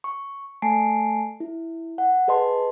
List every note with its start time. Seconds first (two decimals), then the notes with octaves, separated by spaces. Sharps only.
0.04 C#6
0.62 A3 G#5 A5 C7 D7
1.40 E4
1.98 F#5
2.28 G#4 B4 D#5 A5 C6